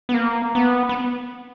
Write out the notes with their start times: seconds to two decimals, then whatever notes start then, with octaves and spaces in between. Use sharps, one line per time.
0.09 B3
0.14 A#3
0.55 B3
0.89 B3